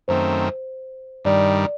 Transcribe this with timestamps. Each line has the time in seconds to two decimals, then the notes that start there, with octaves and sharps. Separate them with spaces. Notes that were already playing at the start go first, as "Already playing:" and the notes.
0.08 F#2 D#3 A3 C4 C5
1.25 G2 D#3 G3 D5